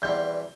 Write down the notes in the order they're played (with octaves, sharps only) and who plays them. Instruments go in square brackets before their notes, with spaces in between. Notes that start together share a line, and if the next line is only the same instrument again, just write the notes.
[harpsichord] E2 B2 G3 C4 [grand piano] G6